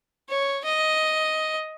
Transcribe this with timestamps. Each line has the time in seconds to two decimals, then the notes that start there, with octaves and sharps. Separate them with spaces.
0.29 C#5
0.64 D#5